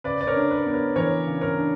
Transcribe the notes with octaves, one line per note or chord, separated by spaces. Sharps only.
C#3 B4 D5
D5
A#4 C#5
D4
B4
B3
A#4
E3 A#4 C#5
C#3
A#4 C#5
D4